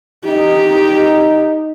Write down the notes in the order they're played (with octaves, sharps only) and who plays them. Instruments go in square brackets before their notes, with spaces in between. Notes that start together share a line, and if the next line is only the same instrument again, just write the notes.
[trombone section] D#4 [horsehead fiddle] G4